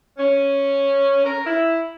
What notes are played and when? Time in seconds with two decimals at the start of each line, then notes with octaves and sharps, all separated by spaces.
0.17 C#4
1.24 A#4
1.46 E4